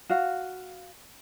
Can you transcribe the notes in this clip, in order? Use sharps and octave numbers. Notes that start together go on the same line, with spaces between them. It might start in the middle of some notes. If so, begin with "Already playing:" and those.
F#4 F5